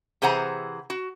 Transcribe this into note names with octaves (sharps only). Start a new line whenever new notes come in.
C3 E3 G#4 C5 F#5 A#5
F#4